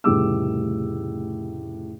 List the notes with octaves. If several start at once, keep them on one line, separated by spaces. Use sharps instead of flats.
F1 A2 C#3 G3 D6 E6